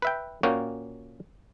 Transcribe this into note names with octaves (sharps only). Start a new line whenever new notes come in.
B4 E5 G5
A#2 A#3 C#4 F#4 G5